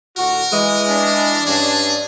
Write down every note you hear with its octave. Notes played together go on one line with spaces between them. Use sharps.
A2 D3 F#4 A#4
E3 G#3
D4
G2 C#4 G#4